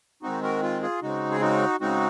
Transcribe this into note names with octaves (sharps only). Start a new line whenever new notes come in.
D#3 G#3 C4 D#4 F#4
F#4 A#4
F4
F4 G#4
C#3 G#3 C4 D#4 F#4
G#4
D#4 F#4
C#3 G#3 C4 D#4 F#4